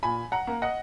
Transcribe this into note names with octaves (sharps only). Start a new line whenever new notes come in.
A#2 G#5 B5
F#5 A#5
A#3
D#5 F#5